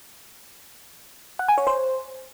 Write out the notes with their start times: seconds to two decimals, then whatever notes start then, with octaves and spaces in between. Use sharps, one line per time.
1.39 F#5
1.48 G#5
1.58 C#5
1.67 C5